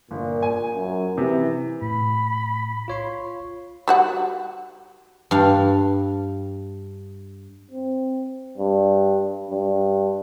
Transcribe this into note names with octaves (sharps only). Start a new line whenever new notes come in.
G1 A#2
G#5
F#2
C3 E3
A2 B5
F4 C#5 C6
G3 F#4 F#5
G2 F5
C4
G2
G2